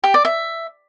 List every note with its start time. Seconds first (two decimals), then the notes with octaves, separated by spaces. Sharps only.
0.04 G4
0.14 D5
0.25 E5